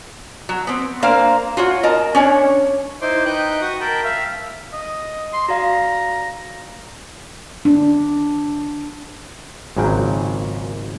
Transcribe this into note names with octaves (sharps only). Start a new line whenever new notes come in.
F#3
B3 C4
A#3 D4 A#4 C5 F5
F4 F#4 C#5
A#4 D#5 A5
C#4 D4 C#5
D#4 E4 C5 C6 D6
D#4 B4 G5 F#6
F#4 C#6 D#6
A#4 G5 A5 B5
E5 F5
D#5
C6
F#4 D5 F5 A#5
D4
G#1 A#2 C#3 F#3 C#4 G5